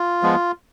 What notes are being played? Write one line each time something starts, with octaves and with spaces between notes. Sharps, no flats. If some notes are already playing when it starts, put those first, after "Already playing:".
Already playing: F4
F3 G#3 B3